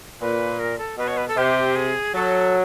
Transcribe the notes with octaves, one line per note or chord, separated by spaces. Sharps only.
A#2 B4
A#4
A4
B2 B4
C#5
B4
A4
C3 G4
G#4
F#3 A4